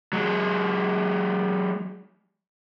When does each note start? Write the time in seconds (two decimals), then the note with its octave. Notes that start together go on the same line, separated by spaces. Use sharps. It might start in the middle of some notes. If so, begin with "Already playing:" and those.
0.13 F#3 G#3